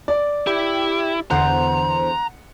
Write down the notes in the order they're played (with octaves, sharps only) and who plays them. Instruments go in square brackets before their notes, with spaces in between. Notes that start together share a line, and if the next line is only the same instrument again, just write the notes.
[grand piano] D5
[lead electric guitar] E4 [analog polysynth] G4
[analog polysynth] E2 D3 C5 [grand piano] F#5 [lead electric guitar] A#5